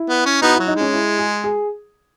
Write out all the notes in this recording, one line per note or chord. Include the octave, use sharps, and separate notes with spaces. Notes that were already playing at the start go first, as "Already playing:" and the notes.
Already playing: E4
B3
C#4
B3 D#4 F#4
F#3 E4
D#4
G#3
C#4
E4
G#4
G#4